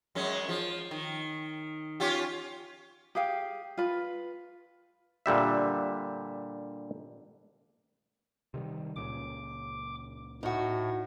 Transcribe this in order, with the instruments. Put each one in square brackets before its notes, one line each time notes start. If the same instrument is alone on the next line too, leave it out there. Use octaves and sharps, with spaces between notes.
[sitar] F#2 G#3 C#4
F3
D#3
C#4 F4 G4
[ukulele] G4 G#4 F5 G5
F4 B4
[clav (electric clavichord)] A#2 D3 G3 E5
[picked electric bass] C3 D#3 G3
[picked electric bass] C#2 A#2 C#3 [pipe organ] D6
[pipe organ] A2 [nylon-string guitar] D#4 F#4